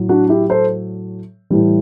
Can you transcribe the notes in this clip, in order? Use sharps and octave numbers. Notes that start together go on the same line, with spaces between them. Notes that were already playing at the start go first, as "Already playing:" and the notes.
Already playing: A2 F#3
D4 F#4
E4 G4
A4 C5
A2 E3 G3